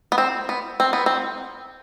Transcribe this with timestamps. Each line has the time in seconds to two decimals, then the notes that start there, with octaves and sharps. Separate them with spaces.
0.12 B3
0.18 C4
0.49 B3
0.80 C4
0.93 B3
1.06 C4